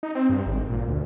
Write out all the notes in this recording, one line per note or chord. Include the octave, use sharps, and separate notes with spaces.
D#4
C4
G2
G#1
A#2
D2